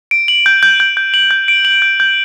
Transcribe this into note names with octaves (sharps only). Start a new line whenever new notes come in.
D7
F#7
G6
G6
G6
G6
F#7
G6
D7
F#7
G6
G6